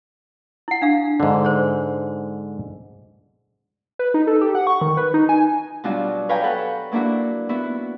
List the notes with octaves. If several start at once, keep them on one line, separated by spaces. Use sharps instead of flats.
E4 F#5
D4 F5
G#2 D3
C5 C#5
B4
D#4
A4
G4
F#5
C#6
D#3
B4
D#4
G#5
B2 F#3 G3 D4 F4 F#4
B4 C#5 F5 G5 G#5 A#5
A4 B4 F#5
F#3 A#3 D4 E4 F#4
B3 E4 F#4